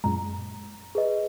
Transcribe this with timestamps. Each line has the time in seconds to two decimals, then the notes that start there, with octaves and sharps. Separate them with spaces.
0.04 F#2 A#2 G#3 A#5
0.95 G#4 B4 D#5